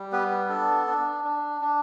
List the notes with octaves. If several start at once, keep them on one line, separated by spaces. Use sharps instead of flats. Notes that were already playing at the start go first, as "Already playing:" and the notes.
Already playing: G3
B3 G4 B4
D4 A4
D4
D4
D4